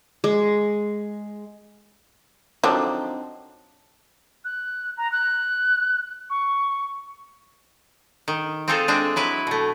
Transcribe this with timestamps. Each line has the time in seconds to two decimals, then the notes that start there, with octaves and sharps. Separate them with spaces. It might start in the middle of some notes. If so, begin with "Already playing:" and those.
0.24 G#3
2.63 D3 F3 F#3 C4 D4 D#4
4.45 F#6
4.98 A#5
5.12 F#6
6.30 C#6
8.28 D#3
8.68 C4 D#4 F4 G#4 A4 C5
8.88 G#3 C4 D4
9.16 F#3 E4 B4
9.47 B2 A3